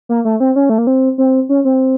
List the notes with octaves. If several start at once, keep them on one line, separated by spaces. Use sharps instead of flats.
A#3
A3
C4
C#4
A3
A#3
C4
C4
C#4
C4